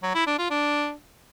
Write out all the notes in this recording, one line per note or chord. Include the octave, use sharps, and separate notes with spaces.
F#3
E4
D4
F4
D4